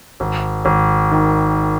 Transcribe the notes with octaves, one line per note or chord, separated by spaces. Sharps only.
G#1
G#1
D#3